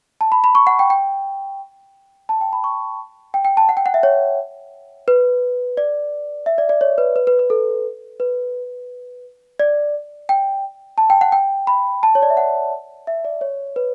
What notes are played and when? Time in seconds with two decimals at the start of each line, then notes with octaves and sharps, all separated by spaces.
0.21 A5
0.32 B5
0.44 B5
0.55 C#6
0.67 F#5
0.79 G5
0.90 G5
2.29 A5
2.41 G5
2.53 B5
2.64 C#6
3.34 G5
3.45 G5
3.57 A5
3.69 F#5
3.77 G5
3.86 F#5
3.94 E5
4.03 C#5
5.08 B4
5.77 D5
6.46 E5
6.58 D5
6.69 D5
6.81 C#5
6.98 B4
7.16 B4
7.27 B4
7.39 B4
7.50 A4
8.20 B4
9.59 D5
10.29 G5
10.98 A5
11.10 G5
11.21 F#5
11.32 G5
11.67 B5
12.03 A5
12.15 C#5
12.22 D5
12.30 E5
12.37 F#5
13.07 E5
13.25 D5
13.41 C#5
13.76 B4